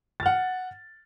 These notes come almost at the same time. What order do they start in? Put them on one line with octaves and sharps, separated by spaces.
A6 F6 F#5